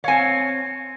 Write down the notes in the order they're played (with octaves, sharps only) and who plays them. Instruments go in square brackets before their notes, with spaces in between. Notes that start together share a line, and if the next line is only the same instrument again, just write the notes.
[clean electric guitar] C4 C#5 [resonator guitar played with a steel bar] F5 G#5